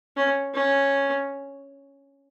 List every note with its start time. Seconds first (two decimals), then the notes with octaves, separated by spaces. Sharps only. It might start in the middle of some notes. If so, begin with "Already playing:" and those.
0.17 C#4
0.54 C#4